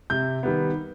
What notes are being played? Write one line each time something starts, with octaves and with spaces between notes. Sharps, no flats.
C3 G6
D#3 G3 B3